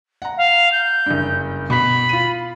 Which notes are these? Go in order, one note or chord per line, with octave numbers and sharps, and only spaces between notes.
F#5 A#5
F5
G6
F#1 G2
B2 B5 B6
F4 D#7